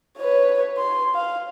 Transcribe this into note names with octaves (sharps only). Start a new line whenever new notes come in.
B4 C#5
C6
F5